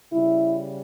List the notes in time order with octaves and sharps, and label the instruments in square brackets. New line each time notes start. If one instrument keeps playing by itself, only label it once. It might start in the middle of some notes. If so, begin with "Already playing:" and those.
[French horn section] C#3 G3 E4